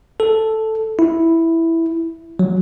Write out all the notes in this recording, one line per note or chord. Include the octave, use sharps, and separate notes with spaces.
A4
E4
F#3